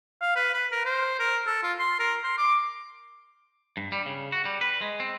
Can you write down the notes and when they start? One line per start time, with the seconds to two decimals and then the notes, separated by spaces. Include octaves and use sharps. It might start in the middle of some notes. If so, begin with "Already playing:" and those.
0.21 F5
0.36 B4
0.54 B4
0.72 A#4
0.85 C5
1.19 A#4
1.46 A4
1.63 F4
1.79 C6
1.99 A#4
2.23 C6
2.38 D6
3.77 G2
3.92 G3
4.06 C#3
4.32 F#4
4.45 G3
4.61 B4
4.81 G#3
5.00 C4